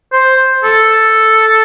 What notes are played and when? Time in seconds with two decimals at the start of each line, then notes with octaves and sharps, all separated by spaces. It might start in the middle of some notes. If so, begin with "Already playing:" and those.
0.13 C5
0.64 A4